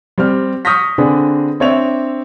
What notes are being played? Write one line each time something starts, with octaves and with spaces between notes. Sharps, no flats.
G3 C4 G4 F6
C#6 D#6 F6 G6 A#6 B6
D3 C4 D4 G#4 B4
C4 D4 C#5 D5 E5 F7